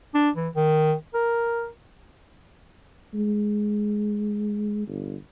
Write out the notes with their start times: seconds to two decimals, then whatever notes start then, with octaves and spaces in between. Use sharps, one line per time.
0.15 D4
0.36 E3
0.56 D#3
1.14 A#4
3.14 G#3
4.87 G1